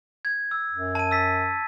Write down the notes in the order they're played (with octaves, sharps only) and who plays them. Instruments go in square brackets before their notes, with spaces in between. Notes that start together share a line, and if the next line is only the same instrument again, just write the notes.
[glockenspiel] G#6
E6
[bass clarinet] F#2
[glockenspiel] A5 D#7
E6 A6 B6